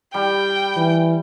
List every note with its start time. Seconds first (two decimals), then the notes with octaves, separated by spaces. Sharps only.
0.14 G3 G5
0.76 E3